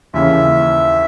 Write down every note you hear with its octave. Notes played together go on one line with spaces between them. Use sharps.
D#2 C#3 E3 E5